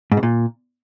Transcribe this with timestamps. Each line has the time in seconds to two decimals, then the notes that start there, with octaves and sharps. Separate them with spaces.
0.12 G#2
0.17 B2
0.23 A#2